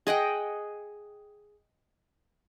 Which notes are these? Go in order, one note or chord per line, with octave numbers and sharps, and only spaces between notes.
G#4 D#5 F#5 G5